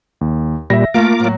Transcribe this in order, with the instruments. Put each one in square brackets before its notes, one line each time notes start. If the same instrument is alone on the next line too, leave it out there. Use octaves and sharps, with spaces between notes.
[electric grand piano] D#2
[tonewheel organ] A#2 G3 [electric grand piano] E5 A#6
[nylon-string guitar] A3 F5 [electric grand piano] A#3 [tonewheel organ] F4 A#4 D6
[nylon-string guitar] A2 F#3